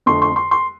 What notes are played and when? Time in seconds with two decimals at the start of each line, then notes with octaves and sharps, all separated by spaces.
0.06 F2 D3 A3 C6
0.22 C6
0.36 C6
0.51 C6